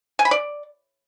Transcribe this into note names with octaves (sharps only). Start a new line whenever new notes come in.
G#5
B5
D5